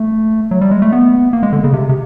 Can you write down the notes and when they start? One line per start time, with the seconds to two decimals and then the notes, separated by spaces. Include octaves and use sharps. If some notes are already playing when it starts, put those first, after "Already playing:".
Already playing: A3
0.51 F#3
0.61 G3
0.71 G#3
0.82 A3
0.92 B3
1.33 A#3
1.43 G#3
1.52 D3
1.64 C#3
1.73 C3
1.89 C3